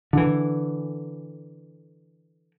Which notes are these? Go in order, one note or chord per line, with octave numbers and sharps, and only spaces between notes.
D3 E3